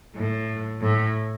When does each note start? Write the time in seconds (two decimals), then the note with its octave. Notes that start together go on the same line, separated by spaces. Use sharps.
0.16 A2
0.80 A2